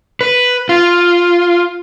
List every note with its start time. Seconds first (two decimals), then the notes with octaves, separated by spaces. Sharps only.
0.21 B4
0.69 F4